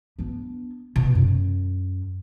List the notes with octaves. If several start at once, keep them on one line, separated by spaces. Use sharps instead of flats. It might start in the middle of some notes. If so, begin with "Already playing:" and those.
B3 D4
B2
F#2